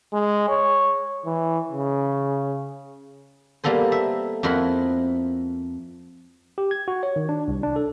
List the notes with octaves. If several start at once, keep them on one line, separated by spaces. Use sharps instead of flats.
G#3
C#5
E3
C#3
G3 A#3 B3 A4 C5
E5
F2 E4 A#4 C5 F#5 B5
G4
G#6
F#4
C#5
D#3
D4
C2
D4
A4